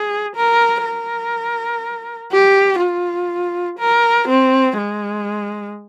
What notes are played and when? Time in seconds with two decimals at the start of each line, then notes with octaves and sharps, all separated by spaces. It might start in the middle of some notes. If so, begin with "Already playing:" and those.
Already playing: G#4
0.36 A#4
0.85 A#4
2.32 G4
2.81 F4
3.79 A#4
4.28 C4
4.77 G#3